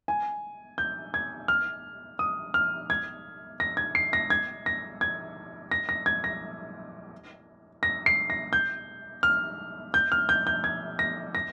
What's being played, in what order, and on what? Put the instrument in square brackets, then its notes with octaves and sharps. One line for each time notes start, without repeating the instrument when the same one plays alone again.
[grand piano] G#5
G6
G#6
F6
D#6
F6
G#6
A#6
G#6
C7
A#6
G#6
A#6
G#6
A#6
A#6
G#6
A#6
A#6
C7
A#6
G6
F6
G6
F6
G6
G6
G#6
A#6
A#6